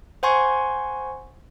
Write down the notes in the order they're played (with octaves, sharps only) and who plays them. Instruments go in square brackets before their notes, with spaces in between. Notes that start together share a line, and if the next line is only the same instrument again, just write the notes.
[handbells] C5 F#5 G#5 C6 C#6 G#6